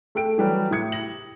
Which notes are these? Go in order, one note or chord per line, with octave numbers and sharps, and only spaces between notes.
A3 A4 G5 D7
E3 F#3 G3 B4
A2 G4 D#6 G#6 C#7
A#6 F#7